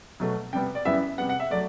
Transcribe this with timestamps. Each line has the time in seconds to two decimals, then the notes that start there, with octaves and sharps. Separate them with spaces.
0.20 B2 F#3 A3
0.53 C3 G3 B3 G5
0.75 D5
0.85 F#2 E3 G3 B3 E5
1.18 C3 G3 B3 F#5
1.29 F#5
1.40 E5
1.50 F#3 A3 D5